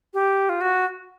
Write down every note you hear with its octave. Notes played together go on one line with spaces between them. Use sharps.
G4
F4
F#4